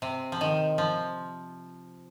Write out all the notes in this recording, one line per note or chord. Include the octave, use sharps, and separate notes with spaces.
C3
F3
D#3
F3